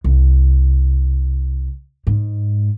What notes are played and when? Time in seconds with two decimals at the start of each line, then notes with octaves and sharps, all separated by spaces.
0.04 C2
2.07 G#2